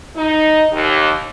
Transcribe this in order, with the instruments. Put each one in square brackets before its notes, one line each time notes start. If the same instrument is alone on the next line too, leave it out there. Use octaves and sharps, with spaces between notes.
[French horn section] D#4
D#2